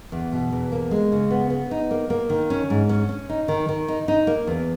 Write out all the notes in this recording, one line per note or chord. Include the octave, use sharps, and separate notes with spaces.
E2
B2
E2
A#3
G#3
C#3
B3
B3
D#4
A#3
A#3
D#3
C#4
G#2
C#4
C#4
D#4
D#3
D#3
D#4
D#4
A#3
E2